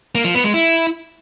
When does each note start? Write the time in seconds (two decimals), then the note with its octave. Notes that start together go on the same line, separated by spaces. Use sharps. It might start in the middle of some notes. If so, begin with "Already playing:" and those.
0.15 A#3
0.25 F3
0.34 B3
0.44 G#3
0.54 E4